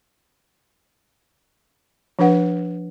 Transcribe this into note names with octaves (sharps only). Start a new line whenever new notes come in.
F3 D4 B4 F#5